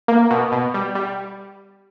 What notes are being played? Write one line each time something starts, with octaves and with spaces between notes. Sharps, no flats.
A#3
B2
B2
G3
G3